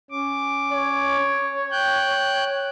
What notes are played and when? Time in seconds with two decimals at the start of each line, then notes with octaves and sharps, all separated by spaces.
0.11 C#4 D6
0.72 C#5
1.71 G5 F#6 G6